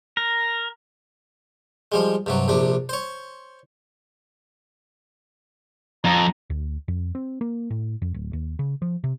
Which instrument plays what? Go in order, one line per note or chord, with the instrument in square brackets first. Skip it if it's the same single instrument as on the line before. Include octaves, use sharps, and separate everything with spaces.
[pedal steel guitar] A#4
[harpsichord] F3 G3 G#3
G2 C3 F#3
A#1 C3 D4
C5 C#5
[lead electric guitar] F2 [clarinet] A#5
[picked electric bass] D2
F2
C4
A#3
A2
F2
D1
D#2
C#3
F3
C3